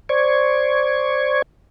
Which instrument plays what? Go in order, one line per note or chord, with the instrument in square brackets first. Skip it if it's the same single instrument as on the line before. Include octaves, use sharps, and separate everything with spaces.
[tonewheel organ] C5 D5 C#6 G#6